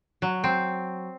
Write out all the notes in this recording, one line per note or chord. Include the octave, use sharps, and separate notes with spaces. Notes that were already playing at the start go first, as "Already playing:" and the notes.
F#3
C4